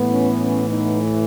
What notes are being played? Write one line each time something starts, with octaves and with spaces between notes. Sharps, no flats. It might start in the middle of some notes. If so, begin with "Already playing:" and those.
Already playing: A2 E3 B3
C#4
C#4
B3 D#4